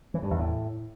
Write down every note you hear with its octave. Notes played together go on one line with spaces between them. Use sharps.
E3
G2
E2
A2